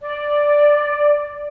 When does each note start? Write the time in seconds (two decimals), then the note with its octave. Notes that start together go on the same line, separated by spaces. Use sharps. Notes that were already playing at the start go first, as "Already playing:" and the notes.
0.01 D5